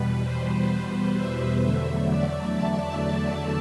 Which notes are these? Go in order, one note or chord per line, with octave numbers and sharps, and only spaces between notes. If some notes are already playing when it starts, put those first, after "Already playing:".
Already playing: E2 B2 G3 B4
C5
E5
E2 D3 F#3 A3 E5
D5
A5